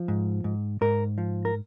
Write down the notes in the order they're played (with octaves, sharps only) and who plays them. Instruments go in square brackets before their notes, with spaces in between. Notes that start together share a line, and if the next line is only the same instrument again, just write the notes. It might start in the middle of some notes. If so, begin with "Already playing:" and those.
Already playing: [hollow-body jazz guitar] F3
G#2
G#2
G#2 A#4
F3
A#4